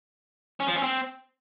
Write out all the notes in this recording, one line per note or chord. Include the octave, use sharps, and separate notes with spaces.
C#4
F3
C#4
C4